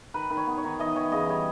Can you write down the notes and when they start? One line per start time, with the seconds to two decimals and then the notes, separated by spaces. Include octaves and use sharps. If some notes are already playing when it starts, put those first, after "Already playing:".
0.14 D#3 B4
0.30 D#3
0.37 C#5
0.47 B3
0.57 C#5
0.64 D#3
0.79 E3 D#5
0.96 E3 C#5
1.12 C#3 D#5
1.29 G3 C#5